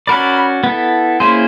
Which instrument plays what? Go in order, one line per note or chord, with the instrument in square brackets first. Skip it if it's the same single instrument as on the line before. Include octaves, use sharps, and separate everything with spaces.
[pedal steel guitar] C#4 F#4 A#4 D5 [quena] B5
[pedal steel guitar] B3 E4 A4
[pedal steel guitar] A#3 C#4 E4 G#4 C5 [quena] C6